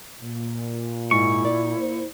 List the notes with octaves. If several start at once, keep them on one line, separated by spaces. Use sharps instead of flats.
A#2
G#2 E4 C#6
D5
A#2 C5